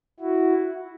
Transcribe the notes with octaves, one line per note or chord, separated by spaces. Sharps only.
E4 F#4